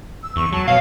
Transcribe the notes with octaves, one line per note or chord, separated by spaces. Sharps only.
E6
E2 C#6
F#3 A5
B2 C#5 F5